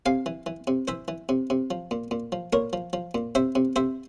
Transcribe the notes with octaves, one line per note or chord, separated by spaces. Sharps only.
C3 F5 G#5
E3
E3
C3
E3 C5 E5
E3
C3
C3
F3
A#2
A#2
F3
A#2 A#4 C#5
F3
F3
A#2
C3 C5 E5
C3
C3 C5 E5